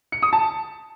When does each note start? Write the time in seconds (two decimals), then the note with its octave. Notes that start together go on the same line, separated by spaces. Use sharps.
0.12 C#7
0.22 D#6
0.33 A5